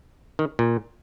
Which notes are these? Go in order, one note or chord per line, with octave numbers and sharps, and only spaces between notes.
D#3
A#2